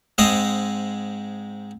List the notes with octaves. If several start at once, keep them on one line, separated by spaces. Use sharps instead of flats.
G#2 G#3 C4 D#5 F5 D#6